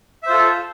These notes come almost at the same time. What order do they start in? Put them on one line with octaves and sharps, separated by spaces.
E5 C5 F4 A4